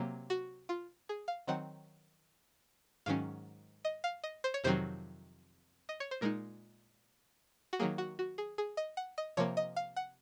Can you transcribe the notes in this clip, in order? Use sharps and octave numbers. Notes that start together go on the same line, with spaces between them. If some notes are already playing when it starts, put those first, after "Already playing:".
Already playing: C3 F#3 A#3
F#4
F4
G#4
F5
D#3 F#3 C4 D#4 F#5
G#2 D#3 F#3 C#4 F5
D#5
F5
D#5
C5
C#5
F2 C3 D#3 F#3 C4 C5
D#5
C#5
C5
A#2 G#3 D#4 A#4
F#4
D#3 F#3 A#3 G#4
F#4
F#4
G#4
G#4
D#5
F#5
D#5
C3 F3 A#3 C#5
D#5
F5
F#5